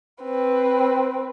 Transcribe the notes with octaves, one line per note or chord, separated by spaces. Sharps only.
C4 B4